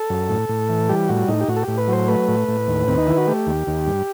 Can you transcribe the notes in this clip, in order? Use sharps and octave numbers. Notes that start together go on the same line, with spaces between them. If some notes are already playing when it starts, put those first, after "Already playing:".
Already playing: A4
F#2
A2
A2
E3
G3 G4
A2 F#4
A2 D#4
G4
A2 F#4
A4
A2 G4
B4
F#3 C5
A3 B4
A2
A2
D#2
D#2 C4
D#4
D#3 E4
F#4
A3 G4
D#2
D#2
G2